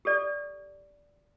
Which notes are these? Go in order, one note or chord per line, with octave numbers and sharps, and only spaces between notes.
G4 A4 D5